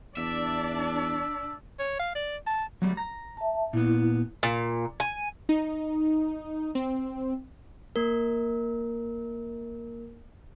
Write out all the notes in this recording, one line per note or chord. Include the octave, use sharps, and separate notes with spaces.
E2 D4 D5 E5
C#5
F5
D5
A5
F#3 G3 A3
A#5
E5 A5
A#2 B3 E4
A#2
G#5
D#4
C4
A#3 A#4